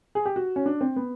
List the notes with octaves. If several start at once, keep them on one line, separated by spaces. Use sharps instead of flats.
G#4
G4
F#4
C#4
D4
C4
B3